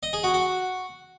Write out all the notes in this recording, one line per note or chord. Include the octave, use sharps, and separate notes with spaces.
D#5
G#4
F#4
F#4